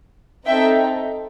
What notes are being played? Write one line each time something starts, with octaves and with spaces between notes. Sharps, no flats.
C4 D#4 A4 E5 G5